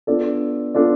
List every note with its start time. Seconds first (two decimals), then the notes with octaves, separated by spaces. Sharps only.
0.07 B3 D4 F4 A4 D5
0.74 B3 D4 F4 A4 D5